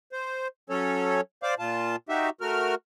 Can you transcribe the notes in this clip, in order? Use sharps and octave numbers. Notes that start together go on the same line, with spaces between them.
C5
F#3 C#4 A4 C#5
C5 D5 F5 D6
A#2 F4 A5
D#4 F#4 G4 E5
A3 F#4 A#4 F6